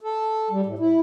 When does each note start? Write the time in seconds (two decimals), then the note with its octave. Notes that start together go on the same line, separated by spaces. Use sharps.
0.01 A4
0.51 G3
0.66 A2
0.79 E4